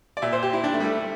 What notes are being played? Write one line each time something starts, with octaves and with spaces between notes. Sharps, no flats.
D5
A#2 E5
C5
G4
E4
D4
A3
G3
A3